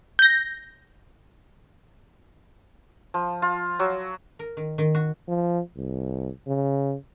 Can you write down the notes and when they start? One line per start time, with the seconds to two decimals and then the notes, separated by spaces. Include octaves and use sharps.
0.19 G6 A#6
3.14 F3
3.42 F4
3.79 F#3
4.39 A#4
4.57 D#3
4.78 D#3
4.95 F#4
5.28 F3
5.76 C2
6.47 C#3